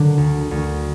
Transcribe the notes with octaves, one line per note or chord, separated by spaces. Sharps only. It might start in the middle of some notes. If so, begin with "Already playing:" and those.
Already playing: D3 F#3
D2
D2